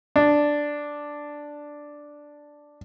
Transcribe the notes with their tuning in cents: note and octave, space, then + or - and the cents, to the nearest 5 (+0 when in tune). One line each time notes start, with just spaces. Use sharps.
D4 +0